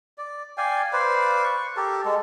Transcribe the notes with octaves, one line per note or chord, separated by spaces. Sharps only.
D5
D5 F5 G5 G#5
B4 C5 D5 F5
C#6
G4 A4 A#4 A5
G#3 A4